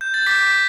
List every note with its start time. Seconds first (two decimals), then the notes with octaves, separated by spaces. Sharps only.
0.01 G6
0.14 A6
0.26 D6 G6 B6